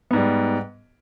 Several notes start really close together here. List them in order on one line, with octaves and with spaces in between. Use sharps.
B3 G#2 G3